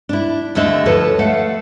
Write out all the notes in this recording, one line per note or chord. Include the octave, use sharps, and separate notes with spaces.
D4 E4
D#2 D3 A3 D4 D#5 E5
D#2 F3 A4 B4 C#5 A5
A3 F5 F#5